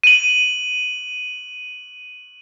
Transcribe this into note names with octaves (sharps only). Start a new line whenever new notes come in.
D#7 F#7